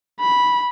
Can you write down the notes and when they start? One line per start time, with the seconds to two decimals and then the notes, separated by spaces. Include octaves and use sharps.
0.20 B5